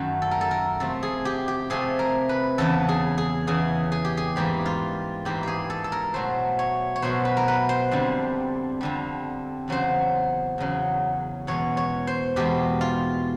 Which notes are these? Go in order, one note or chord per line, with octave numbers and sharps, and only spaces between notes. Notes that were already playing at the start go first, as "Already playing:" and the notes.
Already playing: F#2 D#3 F#3 A3
A4
A#4
A4
A#4
C3 F3 A3 A4
G#4
G4
G4
C3 F3 A3 G#4
A#4
B4
E2 C#3 E3 A4
G#4
G#4
E2 C#3 E3 G#4
G#4
G4
G#4
G#2 E3 G3 A#3 G4
F4
G#2 E3 G3 A#3 G4
G4 G#4
A4
A4
A#4
B2 F#3 A3 C5
C#5
C#5
B2 F#3 A3 C5
B4
A#4
B4
C5
F2 D3 G3
F2 D3 G3
E2 C#3 F#3 C5
E2 C#3 F#3
E2 B2 G#3 C#5
C#5
C5
E2 B2 G#3 G4
F4